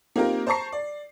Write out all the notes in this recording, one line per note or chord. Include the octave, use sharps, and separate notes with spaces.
A#3 C4 D#4 F4 G4 A#4
C5 A5 A#5 C#6 C7
D5